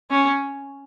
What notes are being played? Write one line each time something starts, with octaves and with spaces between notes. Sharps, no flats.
C#4